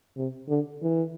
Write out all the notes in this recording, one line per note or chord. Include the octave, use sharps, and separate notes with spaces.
C3
D3
E3